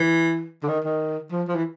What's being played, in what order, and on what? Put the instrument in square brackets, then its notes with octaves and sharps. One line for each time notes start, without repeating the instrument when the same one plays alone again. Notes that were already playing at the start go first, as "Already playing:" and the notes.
Already playing: [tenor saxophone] E3
D3
D#3
D#3
F3
F3
E3